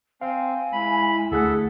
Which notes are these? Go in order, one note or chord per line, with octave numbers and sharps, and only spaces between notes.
C4 F5 G#5
G#3 E4 B5
D2 A3 G#4 A4 E5 F#5 F#6